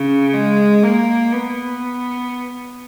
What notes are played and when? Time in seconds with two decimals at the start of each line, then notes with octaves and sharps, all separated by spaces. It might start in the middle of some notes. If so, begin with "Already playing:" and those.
Already playing: C#3
0.34 G#3
0.83 A#3
1.33 B3